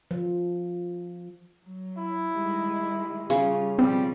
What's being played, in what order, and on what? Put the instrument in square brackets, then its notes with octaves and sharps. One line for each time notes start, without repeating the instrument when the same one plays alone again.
[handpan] F3
[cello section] F#3
[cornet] E4
[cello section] D#3 G3 G#3
[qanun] C#3 [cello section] G3 C#4 F4
[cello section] B2 F3 C#4 [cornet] G3 [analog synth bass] C4